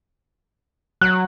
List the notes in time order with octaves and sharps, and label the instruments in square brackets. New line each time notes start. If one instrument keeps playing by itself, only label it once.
[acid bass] F#3 [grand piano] F#6